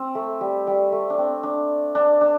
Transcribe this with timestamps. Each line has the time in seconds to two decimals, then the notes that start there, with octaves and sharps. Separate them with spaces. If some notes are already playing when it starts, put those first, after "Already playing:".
Already playing: C4
0.15 A3
0.41 G3
0.67 G3
0.92 A3
1.10 D4
1.18 C4
1.43 D4
1.95 D4
2.21 D4